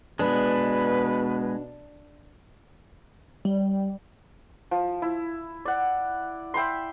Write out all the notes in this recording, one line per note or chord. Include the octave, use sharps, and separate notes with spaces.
B2 G#3 B3 D4 B4
G3
F3
E4
D5 F#5
E5 G5 B5 C6